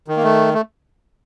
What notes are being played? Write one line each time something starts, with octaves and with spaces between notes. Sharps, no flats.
D#3
A#3
A3
A3